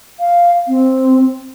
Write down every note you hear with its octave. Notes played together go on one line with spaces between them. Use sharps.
F5
C4